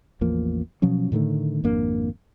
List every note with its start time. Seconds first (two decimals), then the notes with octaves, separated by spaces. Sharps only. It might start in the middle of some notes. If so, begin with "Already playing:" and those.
0.21 A1 E2 F3 A#3
0.82 B2 F3 F#3 C#4
1.12 A2 D3 D#3 A3
1.64 G#1 F2 A#3 D4